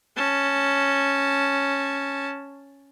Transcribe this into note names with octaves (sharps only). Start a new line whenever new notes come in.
C#4 A5